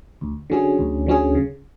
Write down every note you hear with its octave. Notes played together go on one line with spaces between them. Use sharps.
D2
D3 F#3 C#4 G#4
D2
D3 F#3 C#4 G#4
C#3